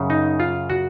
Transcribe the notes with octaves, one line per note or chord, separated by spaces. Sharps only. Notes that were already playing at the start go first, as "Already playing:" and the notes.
Already playing: F#2 C#3
D#4
F4
F#4